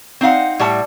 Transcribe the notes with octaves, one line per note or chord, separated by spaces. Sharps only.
C4 D#4 F5 F#5
A2 G3 F#5 A5